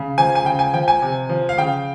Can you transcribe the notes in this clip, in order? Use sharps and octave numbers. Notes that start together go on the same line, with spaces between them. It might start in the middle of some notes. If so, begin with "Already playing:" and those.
Already playing: C#3
F3 G#5
G#5
C#3 G5
G#5
F3 G5
G#5
C3
F3
F5
C#3 G5